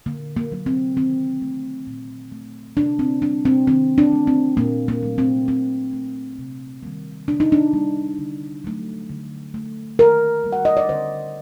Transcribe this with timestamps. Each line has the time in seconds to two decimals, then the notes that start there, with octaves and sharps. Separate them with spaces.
0.06 D3 A#3
0.37 A#3
0.52 F#3 A#3
0.66 C4
0.96 D#3 C4
1.42 A3
1.87 A#2
2.32 A3
2.77 C3 D4
2.99 C4
3.22 G3 A#3 D4
3.45 C4
3.67 D#3 C4
3.98 D4
4.12 A3
4.27 C4
4.57 A#2 A#3
4.88 A#3
5.03 F#3 A3
5.18 C4
5.48 A#2 C4
5.93 A3
6.39 C3
6.83 D#3 G3 A#3
7.28 C3 D4
7.40 D#4
7.52 D4
7.73 G3 A#3
8.19 D3
8.64 F#3 A3
9.09 D3
9.54 A3
9.99 D#3 A#4
10.44 G3 A#3
10.52 F#5
10.65 D#5
10.77 D5
10.89 D3 C5